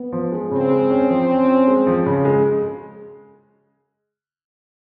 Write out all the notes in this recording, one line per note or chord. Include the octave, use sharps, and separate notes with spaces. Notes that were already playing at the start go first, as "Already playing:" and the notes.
Already playing: B3
F3
G#3
C#3 C4
G#3
C#4
F3
C#4
C#4
G#3
F3
C#3
G#3